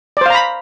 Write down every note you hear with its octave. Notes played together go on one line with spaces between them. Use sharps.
C5 D5 F5 A#5 B5